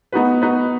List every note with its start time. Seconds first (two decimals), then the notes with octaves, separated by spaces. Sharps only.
0.12 B3 D#4 F#4 B4
0.42 B3 D#4 F#4 B4